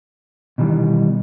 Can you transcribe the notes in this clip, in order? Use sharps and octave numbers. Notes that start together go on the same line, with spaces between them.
B2 D#3 E3 G3